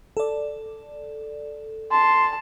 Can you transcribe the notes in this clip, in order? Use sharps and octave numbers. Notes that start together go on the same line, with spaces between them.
A4 D5
A5 C6